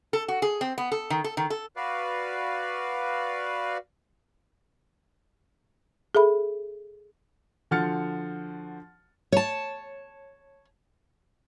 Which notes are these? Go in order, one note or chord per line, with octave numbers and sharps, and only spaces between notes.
A4
F#4
G#4
C4
B3
A4
D#3
A4
D#3
A4
F#4 B4 D5 F5
G#4 A4 E5 B5
D3 F3 F#4 F6 A6 C#7
C#5 A5